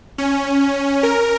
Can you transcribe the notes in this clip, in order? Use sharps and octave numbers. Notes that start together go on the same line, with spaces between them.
C#4
A#4